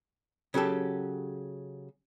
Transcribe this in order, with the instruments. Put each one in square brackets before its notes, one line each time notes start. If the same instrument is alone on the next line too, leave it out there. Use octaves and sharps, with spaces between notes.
[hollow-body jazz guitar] C#3 F#3 G4 A4